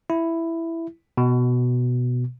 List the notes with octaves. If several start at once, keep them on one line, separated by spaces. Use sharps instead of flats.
E4
B2